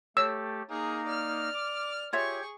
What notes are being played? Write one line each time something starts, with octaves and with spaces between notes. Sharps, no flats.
A3 G4 A4 C#5 E6
A#3 D#4 G#4 A#5
D5 F6
D6
F4 G4 G#4 C#5 E5 C#6 G#6